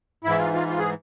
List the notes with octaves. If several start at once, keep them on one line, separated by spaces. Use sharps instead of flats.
G#2 E3 E4
F4
F4
F4
G#4